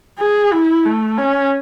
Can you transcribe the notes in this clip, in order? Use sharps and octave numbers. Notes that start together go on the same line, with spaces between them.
G#4
E4
A3
C#4